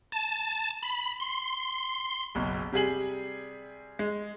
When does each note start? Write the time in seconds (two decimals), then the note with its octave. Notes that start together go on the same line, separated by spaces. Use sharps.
0.12 A5
0.82 B5
1.20 C6
2.35 F#1 B1
2.72 C3 G3 G#4 F#7
3.99 G#3